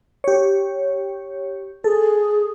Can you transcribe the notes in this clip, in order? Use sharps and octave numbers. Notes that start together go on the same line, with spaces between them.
G4 C#5
G#4 A4